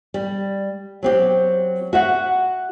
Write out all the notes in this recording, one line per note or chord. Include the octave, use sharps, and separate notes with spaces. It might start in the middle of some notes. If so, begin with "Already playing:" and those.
G3
F#3 C4 G4
F#4 E5 F#5